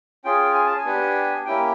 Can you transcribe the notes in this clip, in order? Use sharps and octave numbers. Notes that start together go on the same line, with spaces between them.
C#4 F4 G#4 G5
G#5
A5
G#5
B3 D4 G4
A#3 C#4 E4 G4 G5